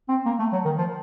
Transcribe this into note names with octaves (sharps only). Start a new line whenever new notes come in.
C4
A#3
A3
F#3
D#3
F3